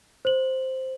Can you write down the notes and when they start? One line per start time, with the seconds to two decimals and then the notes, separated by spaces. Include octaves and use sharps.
0.25 C5 F#7